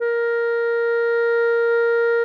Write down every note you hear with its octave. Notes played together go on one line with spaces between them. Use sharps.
A#4